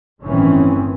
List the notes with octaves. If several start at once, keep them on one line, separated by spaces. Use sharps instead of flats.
G1 A2 D#3 E3 C4 C#4